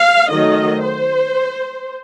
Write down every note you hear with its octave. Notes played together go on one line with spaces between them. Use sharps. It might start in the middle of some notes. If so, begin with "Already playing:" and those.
Already playing: F5
D#3 F#3 A3 D#5
C5